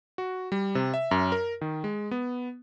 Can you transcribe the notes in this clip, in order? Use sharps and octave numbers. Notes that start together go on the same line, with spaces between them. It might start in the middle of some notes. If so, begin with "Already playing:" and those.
F#4
G3
C3
E5
F#2
A#4
D#3
G#3
B3